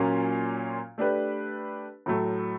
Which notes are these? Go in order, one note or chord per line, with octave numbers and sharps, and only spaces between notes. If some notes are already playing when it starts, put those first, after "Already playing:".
Already playing: A#2 F#3 A#3 C#4 F4
A3 D4 G4 B4
A2 F#3 A3